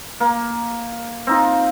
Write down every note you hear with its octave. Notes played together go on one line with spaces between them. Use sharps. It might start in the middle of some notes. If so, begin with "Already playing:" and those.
A#3
C4 D#4 F4